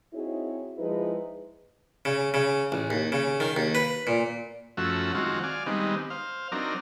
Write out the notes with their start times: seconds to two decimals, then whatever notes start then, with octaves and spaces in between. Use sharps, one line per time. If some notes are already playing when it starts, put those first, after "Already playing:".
0.13 C4 D#4 E4 F#4 G#4 C#5
0.78 F3 G#3 D#4 E4 G#4 B4
2.05 C#3
2.34 C#3
2.72 A1
2.90 D#2
3.12 C#3
3.40 D#3
3.56 D#2
3.75 B4
4.07 A#2
4.77 F#2 F3 A3 C#4 F#4 E5
5.15 D#3 F#3 G#3 C4 F4 F#4
5.43 D5 F5 G#5
5.66 D#3 G3 G#3 B3 C4 D#4
6.10 C5 F5
6.52 F#3 C4 D4 D#4 A#4